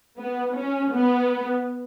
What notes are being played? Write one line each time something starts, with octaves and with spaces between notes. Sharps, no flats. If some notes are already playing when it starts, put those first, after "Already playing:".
B3
C#4
B3